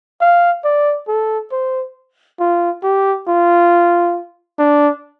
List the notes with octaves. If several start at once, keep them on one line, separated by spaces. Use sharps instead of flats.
F5
D5
A4
C5
F4
G4
F4
D4